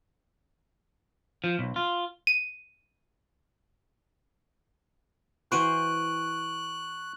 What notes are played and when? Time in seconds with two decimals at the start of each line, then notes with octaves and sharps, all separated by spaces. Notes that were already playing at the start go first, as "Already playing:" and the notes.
1.44 F3
1.59 B1
1.76 F4
2.27 D#7
5.52 E3 F#4 C5 C#6 F#6 D7 D#7